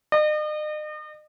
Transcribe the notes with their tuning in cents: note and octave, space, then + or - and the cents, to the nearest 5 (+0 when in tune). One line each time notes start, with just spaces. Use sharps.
D#5 -40